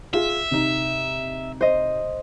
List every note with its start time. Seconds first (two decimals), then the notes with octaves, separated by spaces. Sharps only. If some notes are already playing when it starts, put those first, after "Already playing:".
0.14 F4 G#4 E5 F5
0.51 C3 D#4
1.61 C5 D#5